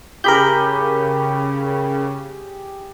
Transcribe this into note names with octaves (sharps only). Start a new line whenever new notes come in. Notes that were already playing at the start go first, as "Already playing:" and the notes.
C#3 G4 G#4 A#4 B5 G6